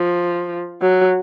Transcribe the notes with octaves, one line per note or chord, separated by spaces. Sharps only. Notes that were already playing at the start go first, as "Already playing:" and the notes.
Already playing: F3
F#3